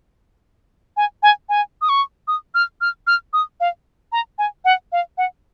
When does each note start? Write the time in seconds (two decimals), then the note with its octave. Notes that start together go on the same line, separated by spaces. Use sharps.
0.97 G#5
1.23 G#5
1.49 G#5
1.81 D#6
1.89 C#6
2.28 D#6
2.54 F6
2.81 F6
3.07 F6
3.33 D#6
3.60 F5
4.12 A#5
4.38 G#5
4.65 F#5
4.92 F5
5.18 F#5